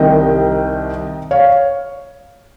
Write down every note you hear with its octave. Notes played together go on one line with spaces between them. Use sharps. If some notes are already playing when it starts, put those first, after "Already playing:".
Already playing: C2 C3 D#3 D#5 G5
C#5 F5